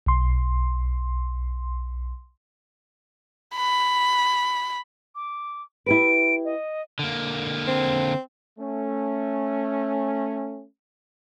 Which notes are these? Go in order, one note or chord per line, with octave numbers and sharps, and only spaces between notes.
B1 C6
B5
D6
E4 G4 B4 D7
D#5
D3 A#3
C4
A3 C#4